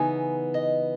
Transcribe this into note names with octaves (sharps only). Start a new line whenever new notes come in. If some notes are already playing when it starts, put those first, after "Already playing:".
Already playing: C#3 E3 B3 D#4 G#5
D#5